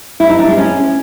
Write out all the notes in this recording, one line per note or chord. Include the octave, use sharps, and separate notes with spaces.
E4
D#4
D4
G#3
C#4